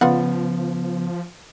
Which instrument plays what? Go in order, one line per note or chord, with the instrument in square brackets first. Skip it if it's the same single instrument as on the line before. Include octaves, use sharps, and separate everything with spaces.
[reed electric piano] C#3 B3 [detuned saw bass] F3 [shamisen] F4 D5 F#5